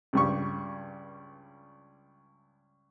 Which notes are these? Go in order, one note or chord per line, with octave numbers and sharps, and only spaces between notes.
C#2 G2 C#6